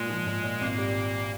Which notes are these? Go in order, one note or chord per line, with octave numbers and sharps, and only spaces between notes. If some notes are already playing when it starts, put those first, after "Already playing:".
Already playing: A#2 G#3
F3
A#2
A#2
G#1 A#3
G3